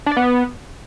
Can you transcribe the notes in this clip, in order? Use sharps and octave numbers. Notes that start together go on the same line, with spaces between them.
D4
D5
B3